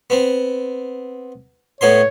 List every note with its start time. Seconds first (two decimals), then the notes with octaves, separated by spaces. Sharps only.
0.10 B3 C4
1.81 A2 B3 C#5 C6